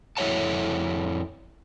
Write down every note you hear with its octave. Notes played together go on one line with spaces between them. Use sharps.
F2 E4 A4 C#5 F#5 A5